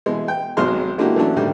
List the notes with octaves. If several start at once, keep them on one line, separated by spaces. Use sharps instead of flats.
B2 E3 G#3
G5
G#1 B2 F#3 G#3 C6 F6
G#3 A#3 D4 E4 F#4 G4
E3 F#3 A3 C#4 D4
A2 D3 D#3 G3